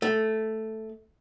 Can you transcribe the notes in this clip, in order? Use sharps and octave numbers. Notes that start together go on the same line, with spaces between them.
A3